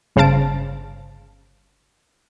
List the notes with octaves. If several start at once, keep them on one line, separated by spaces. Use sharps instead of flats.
G1 C#3 C5 F5 A5 D7